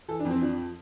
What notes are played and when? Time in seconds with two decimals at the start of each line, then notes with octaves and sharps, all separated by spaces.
0.08 E3 A4
0.19 D4
0.25 F2
0.30 C4
0.41 F3 D4